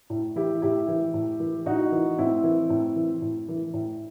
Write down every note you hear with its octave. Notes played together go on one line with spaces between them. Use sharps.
A2
E3 E4 G4
A2 E4 G4
E3
A2
E3
A2 D#4 F#4
E3
A2 C4 E4
E3
A2
E3
A2
E3
A2